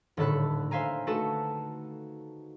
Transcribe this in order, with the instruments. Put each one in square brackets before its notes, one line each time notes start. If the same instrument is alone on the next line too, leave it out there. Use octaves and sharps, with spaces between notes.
[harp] D#1 A2 D3 A4 B5 F#6
C5 E5 F5 G#5 A#5
A3 D#4 F#4 A4 B4 A5